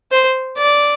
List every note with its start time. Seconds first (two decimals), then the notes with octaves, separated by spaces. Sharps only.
0.12 C5
0.59 D5